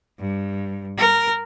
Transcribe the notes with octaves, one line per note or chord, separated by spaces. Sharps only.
G2
A#4